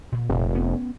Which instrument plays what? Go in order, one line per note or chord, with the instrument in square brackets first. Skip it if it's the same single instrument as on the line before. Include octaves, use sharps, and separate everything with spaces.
[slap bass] A#2
[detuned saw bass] F1
[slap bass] B3 C#4